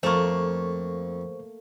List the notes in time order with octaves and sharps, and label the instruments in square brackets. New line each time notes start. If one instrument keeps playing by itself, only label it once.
[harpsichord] F2 [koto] A3 A#3 [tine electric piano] C5 C#6